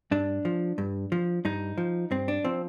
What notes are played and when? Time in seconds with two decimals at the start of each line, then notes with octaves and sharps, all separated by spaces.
0.11 G2 D4
0.45 F3
0.78 G2
1.12 F3
1.45 G2 D#4
1.78 F3
2.11 G2 C4
2.28 D4
2.45 F3 C4